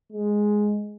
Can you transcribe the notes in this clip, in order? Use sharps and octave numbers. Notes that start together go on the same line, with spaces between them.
G#3